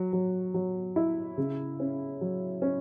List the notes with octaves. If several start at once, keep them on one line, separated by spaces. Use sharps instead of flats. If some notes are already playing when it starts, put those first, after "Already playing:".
Already playing: F#3
F#3
F#3
E4
C#3
C#4
F#3
C#4